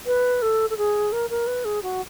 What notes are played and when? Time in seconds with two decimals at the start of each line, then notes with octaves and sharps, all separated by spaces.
0.06 B4
0.42 A4
0.70 A4
0.77 G#4
1.12 A#4
1.30 A#4
1.47 B4
1.65 G#4
1.83 F#4